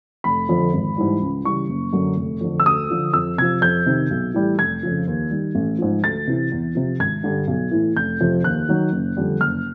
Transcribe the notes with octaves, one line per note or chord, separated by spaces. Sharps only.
F1 B5
F2 D3 F3
G#1
G#2 E3 G3
C#2
C#3 E3 G3 C#6
F#1
F#2 D3 F#3
F1
F2 D3
E6
D2 D#6
D3 F3
F2 E6
C3 F3 G#6
F2 G6
C3 D#3
B1
A2 E3 G3
F1 G#6
F2 C#3 F3
D#2
D#3 G3
A1
G#2 F3
D2 A6
C3 E3
E2
C3 F3
G#1 G#6
G2 D3 G3
B1
A2 E3
F1 G6
F2 C3 F3
D#2 F#6
D#3 F#3
F#1
F2 D3 G3
F#1 F6